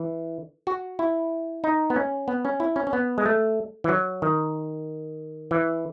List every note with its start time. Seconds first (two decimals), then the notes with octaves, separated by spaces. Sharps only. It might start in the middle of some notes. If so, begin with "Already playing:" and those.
Already playing: E3
0.67 F#4
0.99 E4
1.64 D#4
1.90 B3
1.96 C#4
2.28 B3
2.45 C#4
2.60 E4
2.76 C#4
2.87 C#4
2.93 B3
3.18 G#3
3.26 A3
3.84 E3
3.89 F#3
4.22 D#3
5.51 E3